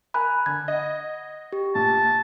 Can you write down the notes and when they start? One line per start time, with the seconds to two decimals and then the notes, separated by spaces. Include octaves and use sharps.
0.14 A#4 G#5 B5 F#6
0.46 D3 G#6
0.68 D#5 F#5
1.53 G4
1.75 A#2 A5